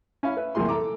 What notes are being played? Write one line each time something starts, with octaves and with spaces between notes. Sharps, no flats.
C#4 E4 F5 B5
B4 E5
C2 F#2 A#2 E3 G#4 C6
A4 A#5 D6